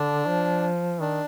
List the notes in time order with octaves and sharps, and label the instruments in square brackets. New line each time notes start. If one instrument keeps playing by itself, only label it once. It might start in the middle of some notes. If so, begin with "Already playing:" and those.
Already playing: [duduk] D3 [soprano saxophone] D4
[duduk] F3
[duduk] D#3 [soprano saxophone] D4